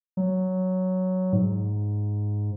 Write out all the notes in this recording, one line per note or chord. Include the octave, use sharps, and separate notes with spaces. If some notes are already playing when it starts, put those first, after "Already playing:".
F#3
G#2